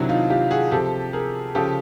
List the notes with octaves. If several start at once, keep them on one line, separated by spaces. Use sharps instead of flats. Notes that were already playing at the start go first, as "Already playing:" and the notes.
Already playing: C3 D#3 F#3 D4 E4
D#4 F4
F4 G4
F#4 G#4
C3 F3 G4 A4
G#4 A#4
C#3 F3 G4 A4